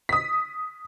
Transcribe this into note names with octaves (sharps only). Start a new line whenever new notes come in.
D#6 B6